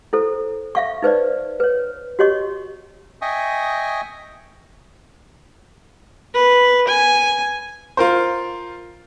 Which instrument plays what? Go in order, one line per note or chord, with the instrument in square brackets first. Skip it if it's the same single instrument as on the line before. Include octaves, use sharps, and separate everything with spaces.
[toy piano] E4 A4 C5
E5 F5 C#6
D#4 B4 C5 D5
B4 C#5
F#4 G4 C#5 D#5 C#6
[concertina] D#5 E5 G5 G#5 C#6 D#6
[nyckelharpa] B4
G#5
[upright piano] F4 A#4 C5